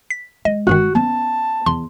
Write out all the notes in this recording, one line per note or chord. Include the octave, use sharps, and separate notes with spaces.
B6
G#3 D#5
G1 G2 D#3 F#4
B3 C#4 A5
E2 C6